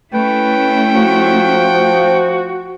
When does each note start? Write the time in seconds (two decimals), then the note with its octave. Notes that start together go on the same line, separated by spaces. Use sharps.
0.14 A3 C#4 E4 B4 G5
0.95 F3 F#4